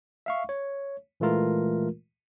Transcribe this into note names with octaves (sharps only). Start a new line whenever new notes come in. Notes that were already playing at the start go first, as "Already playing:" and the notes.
E5 F5 C#6
C#5
A#2 E3 G#3 A3 F4 A#4